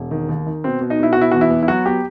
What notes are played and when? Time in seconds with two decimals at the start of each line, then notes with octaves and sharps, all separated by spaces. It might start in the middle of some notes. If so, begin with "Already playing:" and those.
Already playing: E1
0.11 D#3
0.29 D#2
0.46 D#3
0.64 B2 C4
0.81 B2
0.90 D#4
0.99 B2 E4
1.13 B2 F#4
1.21 E4
1.31 E2 F#4
1.41 E4
1.50 B3
1.63 E4
1.68 F#3 F#4
1.86 B3 G4